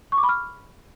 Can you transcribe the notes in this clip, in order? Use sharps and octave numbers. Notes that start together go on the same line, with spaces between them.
C#6
D6
B5
F6